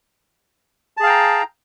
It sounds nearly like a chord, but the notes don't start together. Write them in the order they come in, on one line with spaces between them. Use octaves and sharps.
A5 G#4 F5 G5 A#5